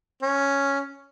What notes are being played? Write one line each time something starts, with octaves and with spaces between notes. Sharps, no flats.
C#4